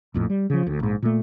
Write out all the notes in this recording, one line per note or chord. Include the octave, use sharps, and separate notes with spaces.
A#1 F2 A2
G3
C#3 F3
D2
A#1 G#2
A#2 A3